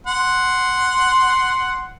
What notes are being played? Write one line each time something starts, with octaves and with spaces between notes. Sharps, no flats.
F#5 C6